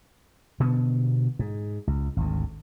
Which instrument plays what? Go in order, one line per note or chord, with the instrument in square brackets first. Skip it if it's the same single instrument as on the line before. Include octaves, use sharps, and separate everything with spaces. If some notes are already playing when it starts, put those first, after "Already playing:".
[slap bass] B2 D3 B3
G#2
C#2
G#1 D2